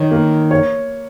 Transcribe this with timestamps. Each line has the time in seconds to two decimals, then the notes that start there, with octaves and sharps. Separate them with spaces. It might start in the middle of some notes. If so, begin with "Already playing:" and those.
Already playing: D#3 C#5
0.11 A#3
0.51 C#5